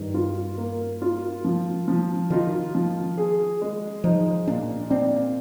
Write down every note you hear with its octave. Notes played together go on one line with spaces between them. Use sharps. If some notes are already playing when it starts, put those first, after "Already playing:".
Already playing: G2 D#3
F4
A#3
F4
F3
F3
D#3 F4
F3
G#4
G#3
F3 D#4
A#2 D4
C4 D4